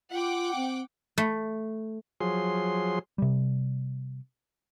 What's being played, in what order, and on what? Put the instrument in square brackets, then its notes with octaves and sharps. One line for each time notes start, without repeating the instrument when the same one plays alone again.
[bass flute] F4 [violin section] F#5 G5 D6
[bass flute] C4
[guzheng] A3
[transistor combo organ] F3 F#3 G#4 C6
[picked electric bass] C3 G3